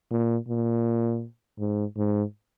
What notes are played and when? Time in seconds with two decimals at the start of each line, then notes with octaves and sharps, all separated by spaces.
0.11 A#2
0.48 A#2
1.59 G#2
1.97 G#2